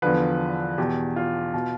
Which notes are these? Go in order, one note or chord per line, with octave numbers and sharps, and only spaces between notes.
E2 D3 F3 B4
E2 B2 G4
F4
B2